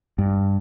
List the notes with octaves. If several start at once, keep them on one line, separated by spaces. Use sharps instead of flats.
G2